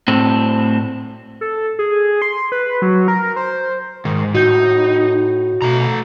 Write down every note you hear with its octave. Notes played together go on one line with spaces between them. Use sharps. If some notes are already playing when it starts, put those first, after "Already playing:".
A2 C4
A4
G#4
C6
B4
F#3
A#4
C5
G#2 D#3
A2 D#4 F#4 G6
B2 A3 A#5